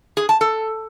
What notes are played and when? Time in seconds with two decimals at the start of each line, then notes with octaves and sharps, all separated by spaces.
0.17 G#4
0.29 A5
0.41 A4